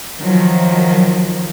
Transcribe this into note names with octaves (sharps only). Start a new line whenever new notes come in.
D#3 F3 F#3